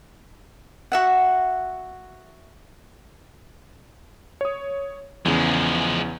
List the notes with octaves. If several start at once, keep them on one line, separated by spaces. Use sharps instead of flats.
F#4 E5 F#5
C#5 D#6
E2 C#3 F3 G#3